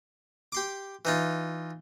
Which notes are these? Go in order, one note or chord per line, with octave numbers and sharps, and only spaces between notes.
G4 C6 D6
E3 D#4 F4